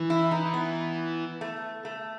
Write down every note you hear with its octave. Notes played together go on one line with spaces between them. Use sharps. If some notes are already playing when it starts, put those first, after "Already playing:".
Already playing: E3
E4
D#4
B3
A3
A3